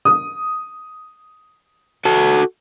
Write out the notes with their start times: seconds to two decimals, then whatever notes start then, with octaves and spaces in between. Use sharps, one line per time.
0.05 D#6
2.05 F#4 A4 A5